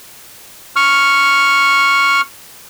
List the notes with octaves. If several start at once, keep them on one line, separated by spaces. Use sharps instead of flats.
C#6 F6